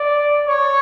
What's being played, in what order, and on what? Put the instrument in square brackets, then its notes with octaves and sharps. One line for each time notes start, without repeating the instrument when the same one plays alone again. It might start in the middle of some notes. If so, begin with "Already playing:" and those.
Already playing: [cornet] D5
C#5